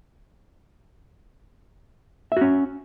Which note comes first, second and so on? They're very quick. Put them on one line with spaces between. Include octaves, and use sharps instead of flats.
E5 F#4 C#4